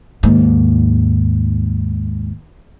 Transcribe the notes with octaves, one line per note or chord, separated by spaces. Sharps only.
D#2 G#2